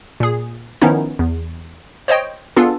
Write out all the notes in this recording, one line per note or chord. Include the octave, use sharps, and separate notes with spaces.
A#2 G#4
D#3 F3 B3 C#4 D#4 E4
E2
C5 C#5 D#5 G5
B3 D4 F4 G#4 A4